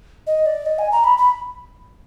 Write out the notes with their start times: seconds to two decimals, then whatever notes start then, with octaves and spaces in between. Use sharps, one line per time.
0.27 D#5
0.46 D5
0.66 D#5
0.79 G#5
0.92 A#5
1.04 B5
1.18 B5